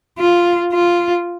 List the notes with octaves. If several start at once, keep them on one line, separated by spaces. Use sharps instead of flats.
F4
F4